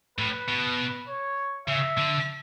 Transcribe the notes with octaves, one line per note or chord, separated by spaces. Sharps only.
A2 B4
B2
C#5
C#3 E5
D3